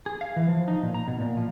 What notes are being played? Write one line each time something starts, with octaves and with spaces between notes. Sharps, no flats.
G#4
F5
E3
F3
D#4
A#2
A#5
B2
A#2
F3